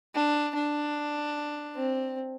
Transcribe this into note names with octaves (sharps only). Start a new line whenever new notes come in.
D4
D4
C4